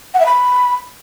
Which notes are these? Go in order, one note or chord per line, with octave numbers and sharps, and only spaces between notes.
F#5
E5
B5